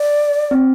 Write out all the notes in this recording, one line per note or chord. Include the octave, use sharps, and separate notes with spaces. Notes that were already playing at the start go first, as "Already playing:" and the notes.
Already playing: D5
C4